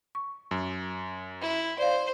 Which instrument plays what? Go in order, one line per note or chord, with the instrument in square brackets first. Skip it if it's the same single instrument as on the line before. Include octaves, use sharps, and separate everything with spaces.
[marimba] C#6
[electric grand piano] F#2
[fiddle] E4
[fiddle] C5 [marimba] D5 F5